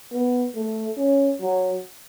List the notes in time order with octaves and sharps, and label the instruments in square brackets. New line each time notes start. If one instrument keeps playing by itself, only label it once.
[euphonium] B3
A3
C#4
F#3